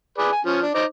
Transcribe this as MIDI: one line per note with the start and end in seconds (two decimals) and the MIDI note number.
0.18 0.30 68
0.18 0.30 71
0.18 0.30 74
0.32 0.41 80
0.45 0.62 53
0.45 0.62 61
0.62 0.74 62
0.75 0.84 63
0.75 0.84 72
0.75 0.84 86